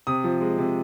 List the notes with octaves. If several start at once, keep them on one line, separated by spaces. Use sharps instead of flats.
C3 D#6
F3
G#3
C3